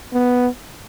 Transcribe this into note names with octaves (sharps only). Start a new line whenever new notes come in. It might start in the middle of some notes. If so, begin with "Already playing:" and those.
B3